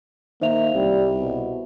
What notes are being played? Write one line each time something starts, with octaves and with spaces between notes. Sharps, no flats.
D#3 A#3 C5 E5 F7
C2 G3
B2